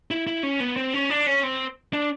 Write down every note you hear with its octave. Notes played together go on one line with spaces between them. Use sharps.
E4
E4
C#4
B3
C4
C#4
D4
C#4
C4
D4